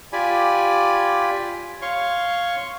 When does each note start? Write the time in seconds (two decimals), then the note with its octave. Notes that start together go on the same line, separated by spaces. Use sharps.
0.13 F4 G4 D5 G#5 B5
1.82 C#5 F5 C6 C#6